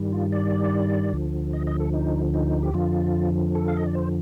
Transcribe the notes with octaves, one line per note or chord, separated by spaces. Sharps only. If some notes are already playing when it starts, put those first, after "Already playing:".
Already playing: G2 D#3 G3
F4
D5
D2 D3 F3
D#5
D#5
A4
D#4
D#4
G4
F2 D3 F3 F4
A4
F5
D#5
D5
C5